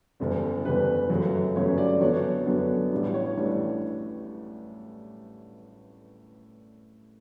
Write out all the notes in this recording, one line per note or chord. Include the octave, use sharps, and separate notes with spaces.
F#1 E2 D3 G3
F#1 E2 D3 G3 B4
G1 F#2 C#3 F#3 A3
G1 F#2 C#3 F#3 A3 C#5
D5
F#2 D3 F#3 B3 D4 C#5
F#2 D3 F#3 B3 D4
A1 A2 G3 D4
C#5
A1 A2 G3 D4